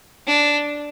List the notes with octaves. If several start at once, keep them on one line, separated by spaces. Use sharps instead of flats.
D4